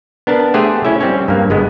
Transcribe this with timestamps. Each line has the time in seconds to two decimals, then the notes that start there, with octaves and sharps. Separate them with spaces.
0.27 B3 D4 A#4 A5
0.54 A3 G4 G#4 C5 F#5 G#5
0.85 C#4 E4 E5
1.01 G3 C4 C#4
1.28 G2 A#3
1.50 G1 G#3 B3